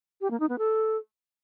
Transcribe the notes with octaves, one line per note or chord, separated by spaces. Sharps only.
G4
A#3
D#4
B3
A4